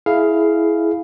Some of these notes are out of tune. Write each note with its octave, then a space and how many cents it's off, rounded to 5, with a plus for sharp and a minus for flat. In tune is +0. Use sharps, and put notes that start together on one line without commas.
E4 +0 G#4 +20 F5 +0